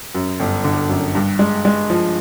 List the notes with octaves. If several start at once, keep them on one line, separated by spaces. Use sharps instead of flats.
F#2
G1
D3
F#2
G2
G#3
G#3
F3